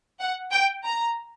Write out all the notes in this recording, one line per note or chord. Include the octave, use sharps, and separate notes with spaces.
F#5
G5
A#5